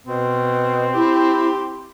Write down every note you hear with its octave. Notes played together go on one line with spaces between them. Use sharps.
B2 C4
E4 G4